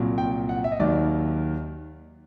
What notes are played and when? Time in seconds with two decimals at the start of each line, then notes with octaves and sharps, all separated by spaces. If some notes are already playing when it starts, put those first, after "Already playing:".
Already playing: C2 A#2 F#3
0.18 G5
0.49 F#5
0.64 E5
0.72 D#5
0.80 D#2 D#3 F#3 D5